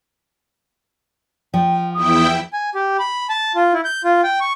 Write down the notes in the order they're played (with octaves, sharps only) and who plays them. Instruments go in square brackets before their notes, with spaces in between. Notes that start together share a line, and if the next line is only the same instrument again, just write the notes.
[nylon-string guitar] F3 [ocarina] G5
[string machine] E2 E4 G5 [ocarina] D#6
[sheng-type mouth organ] G#5
G4
B5
A5
F4
E4
G6
F4
G5
C#6